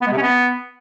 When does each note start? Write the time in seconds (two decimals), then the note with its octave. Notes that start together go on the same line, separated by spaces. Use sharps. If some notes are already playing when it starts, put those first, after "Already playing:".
0.02 B3
0.07 G#3
0.12 C3
0.17 C#4
0.22 B3